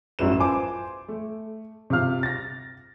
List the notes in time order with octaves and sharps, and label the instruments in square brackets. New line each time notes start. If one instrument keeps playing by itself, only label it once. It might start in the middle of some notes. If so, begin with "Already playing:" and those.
[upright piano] A1 F#2 E4 F#4 B4 E7
F4 C5 G#5 C6 D6
A3
C3 C4 F4 F5 F6
A6 A#6